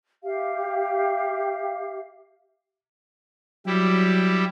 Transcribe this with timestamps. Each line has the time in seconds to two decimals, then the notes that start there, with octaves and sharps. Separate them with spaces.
0.24 G4 E5 F5
3.66 F#3 G3 E4 G4